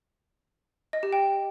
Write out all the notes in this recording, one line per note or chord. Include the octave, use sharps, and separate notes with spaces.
D#5
G4
G5